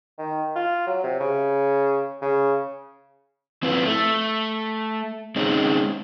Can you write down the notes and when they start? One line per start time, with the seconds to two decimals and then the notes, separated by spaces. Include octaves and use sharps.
0.18 D#3
0.56 F4
0.87 F#3
1.03 C3
1.20 C#3
2.22 C#3
3.63 F3 C4 E4 F4 B4
3.85 A3
5.36 G#3 C4 C#4 D#4